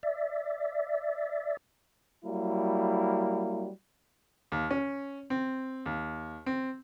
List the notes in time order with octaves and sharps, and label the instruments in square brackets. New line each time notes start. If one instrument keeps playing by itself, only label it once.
[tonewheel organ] D5 E5
[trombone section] F#3 G3 A#3 E4
[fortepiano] D#2
C#4
C4
D#2
C4